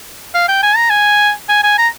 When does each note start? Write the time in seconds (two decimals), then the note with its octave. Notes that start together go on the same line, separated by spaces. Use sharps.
0.34 F5
0.48 G5
0.63 G#5
0.76 A#5
0.90 G#5
1.49 G#5
1.63 G#5
1.78 A#5